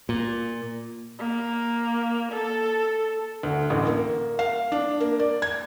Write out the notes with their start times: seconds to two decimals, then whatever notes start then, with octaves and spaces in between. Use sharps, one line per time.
0.09 A#2
1.19 A#3
2.32 A4
3.43 D2
3.70 A1
3.87 A#3
4.39 F5
4.72 D4
5.00 A#3
5.19 D5
5.42 G#6